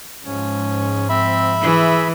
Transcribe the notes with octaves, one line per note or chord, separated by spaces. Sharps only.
G#2 F3 C#4
C4 E5 B5
E3 G#4